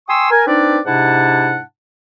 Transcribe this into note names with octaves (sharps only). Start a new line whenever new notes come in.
G5 G#5 C6 C#6 D#6 E6
A#4 G#5
C4 D4 D#4 B4 D5
G#2 C3 D4 E4 F#5 A5